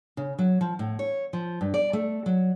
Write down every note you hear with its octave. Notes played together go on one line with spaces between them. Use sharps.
C#3
F#3
F3
A2
C#5
F3
G2
D5
A3
F#3